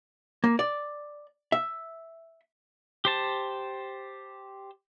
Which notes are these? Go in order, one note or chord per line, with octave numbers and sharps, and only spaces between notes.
A#3
D5
E5
G4 C5 A5